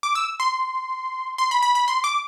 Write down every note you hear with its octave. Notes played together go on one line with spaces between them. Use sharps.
D6
E6
C6
C6
B5
B5
B5
C6
D6